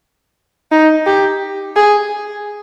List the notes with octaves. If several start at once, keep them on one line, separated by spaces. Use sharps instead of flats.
D#4
G4
G#4